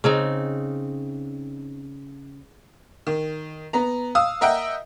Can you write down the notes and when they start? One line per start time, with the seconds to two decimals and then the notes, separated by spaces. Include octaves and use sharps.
0.04 C#3 C4 D#4
3.07 D#3
3.73 B3 A#5
4.15 F5 D#6 E6
4.41 A#4 D#5 E5 F#5 G5